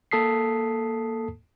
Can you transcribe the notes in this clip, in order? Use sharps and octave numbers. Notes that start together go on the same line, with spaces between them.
A#3 A4 A5 D#6 B6 C7